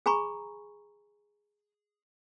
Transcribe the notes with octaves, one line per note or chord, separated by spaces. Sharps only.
G#4 G#5 A#5 B5 C#6